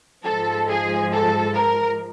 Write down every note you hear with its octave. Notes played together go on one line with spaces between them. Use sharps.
G#2 F3 G#3 A4
G#4
A4
A#4